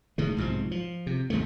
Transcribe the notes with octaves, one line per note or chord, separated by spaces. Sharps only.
A2 D#3 G#3
B1 G#2 C3 F3
F3
C3
D#2 G#2 C3 A3